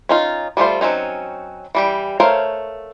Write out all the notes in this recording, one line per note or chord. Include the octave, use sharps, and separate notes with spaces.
C#4 D#4 F4
G3 A3 F4 C5
F#3 C4 C#4 D#4
E3 G3 G4
A3 A#4 C5 C#5 F5